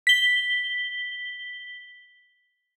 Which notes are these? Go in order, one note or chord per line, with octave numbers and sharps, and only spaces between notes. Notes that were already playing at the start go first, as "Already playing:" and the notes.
B6 G7